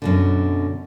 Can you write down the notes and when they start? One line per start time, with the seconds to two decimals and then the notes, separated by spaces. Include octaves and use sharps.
0.02 F#2 B2 D3